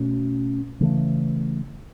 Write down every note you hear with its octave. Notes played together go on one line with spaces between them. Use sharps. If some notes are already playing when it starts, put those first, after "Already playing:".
Already playing: B2 A3 C#4
C#3 E3 A3